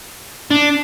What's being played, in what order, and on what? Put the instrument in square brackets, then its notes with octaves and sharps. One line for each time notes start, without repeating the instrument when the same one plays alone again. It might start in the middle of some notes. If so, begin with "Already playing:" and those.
[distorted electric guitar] D4